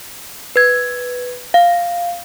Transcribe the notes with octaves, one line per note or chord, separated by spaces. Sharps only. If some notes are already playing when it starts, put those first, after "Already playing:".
B4 G#6
F5